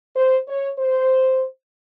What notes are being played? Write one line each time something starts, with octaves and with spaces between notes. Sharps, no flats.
C5
C#5
C5